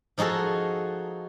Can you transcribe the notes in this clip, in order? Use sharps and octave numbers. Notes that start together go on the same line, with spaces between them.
F3 D#4 F#4 G#4 A4